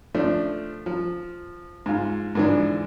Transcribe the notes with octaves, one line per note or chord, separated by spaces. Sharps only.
F3 A3 D4 C5
F3
G#2 F4
G#2 D3 E3 F3 D4